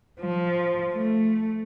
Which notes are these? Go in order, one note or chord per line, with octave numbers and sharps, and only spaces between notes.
F3
A3